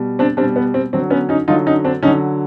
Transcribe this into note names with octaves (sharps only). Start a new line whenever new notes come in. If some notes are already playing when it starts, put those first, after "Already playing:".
Already playing: B2 G3
C4 D4
B2 G3 C4 D4
B3
C4
D3 F#3 C4
B3 C#4
C#4 D#4
D3 F#3 D#4 F4
C#4 D#4
C4 D4
D3 F#3 C#4 D#4